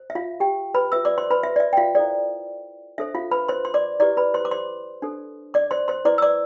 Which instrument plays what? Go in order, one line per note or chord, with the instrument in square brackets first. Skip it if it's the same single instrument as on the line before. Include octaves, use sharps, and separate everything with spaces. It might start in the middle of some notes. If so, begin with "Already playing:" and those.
Already playing: [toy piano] C5
E5
F4 F5
G4 G5
B4 B5
F4 B4 E5 E6
D5 D6
C5 C6
B4 B5
E5
D5
E5
G5
F4 F5
E4 A4 C5 D5
D4 A4 C5 E5
F4 F5
B4 B5
C5 C6
C6
D5 D6
E4 G4 B4 D5 D6
B4 B5
C5 C6
D6
C5 C6
D4 A4 C5
D5 D6
C5 C6
C5 C6
E4 B4 D5 D6
E6
D5 D6